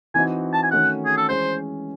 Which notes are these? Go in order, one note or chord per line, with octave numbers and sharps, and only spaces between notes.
E3 C4 D#4 F#4 G#5
A5
G#5
D#3 A3 C#4 F#4 F#5
G#4
A4
E3 G#3 C#4 C5